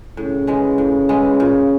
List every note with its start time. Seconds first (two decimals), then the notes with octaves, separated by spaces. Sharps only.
0.17 A2 C#3
0.47 E3 G#3
0.78 A2
1.09 E3 G#3
1.40 A#2